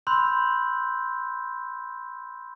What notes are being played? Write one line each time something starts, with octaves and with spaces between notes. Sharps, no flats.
B5 C6 E6 F#6 G6